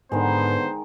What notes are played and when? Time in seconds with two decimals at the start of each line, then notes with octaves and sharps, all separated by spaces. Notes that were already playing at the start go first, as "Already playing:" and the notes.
0.12 G#2 D3 D#3 G#3 B3 C5